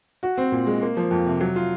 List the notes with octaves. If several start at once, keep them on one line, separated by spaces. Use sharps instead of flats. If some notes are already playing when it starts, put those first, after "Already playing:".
F#4
C4
A#2
G#3
A#3
F3
F2
C3
F#3
F4